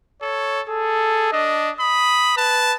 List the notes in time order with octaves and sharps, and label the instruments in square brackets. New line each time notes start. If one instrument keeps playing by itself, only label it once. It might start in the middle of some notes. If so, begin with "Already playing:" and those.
[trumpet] A4 [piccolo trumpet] C#5
[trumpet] G#4 [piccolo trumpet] A4
[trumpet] D4 [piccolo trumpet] D#5
[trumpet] B5 [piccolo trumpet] D#6
[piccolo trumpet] B4 [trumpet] A5